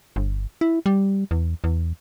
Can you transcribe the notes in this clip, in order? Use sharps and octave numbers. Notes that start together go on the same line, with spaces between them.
G1
E4
G3
E2
E2